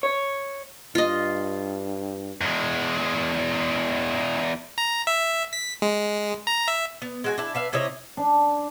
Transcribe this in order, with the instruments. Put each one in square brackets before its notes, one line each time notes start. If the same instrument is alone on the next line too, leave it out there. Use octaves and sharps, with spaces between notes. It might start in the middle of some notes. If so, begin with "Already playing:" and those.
[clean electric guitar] C#5
[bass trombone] G2 [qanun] F4 D#5
[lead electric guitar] E2 G#3
[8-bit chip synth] A#5
E5
B6
G#3
A#5
E5
[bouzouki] B3
G#3 F#4 G#5
D4 E4
B4 E5 F5
C3 E4 C#5 D#5
[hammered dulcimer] D4